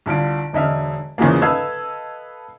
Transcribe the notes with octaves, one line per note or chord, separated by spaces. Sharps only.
C2 D3 F4 D7
E1 D3 D#5 E5 F6
E2 C#3 E3 F3 G#3 A#3
A4 B4 D#5 F5 E6 G#6